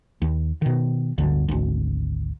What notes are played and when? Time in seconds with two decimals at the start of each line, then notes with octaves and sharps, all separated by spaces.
0.22 D#2
0.62 B2 D#3
1.18 D1 G1 D2 D3
1.49 G#1 D2